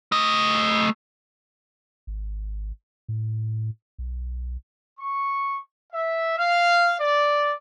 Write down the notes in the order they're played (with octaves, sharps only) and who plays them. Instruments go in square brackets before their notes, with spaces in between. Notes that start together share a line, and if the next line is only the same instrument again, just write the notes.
[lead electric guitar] A3 D#5
[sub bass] G#1
A2
B1
[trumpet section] C#6
E5
F5
D5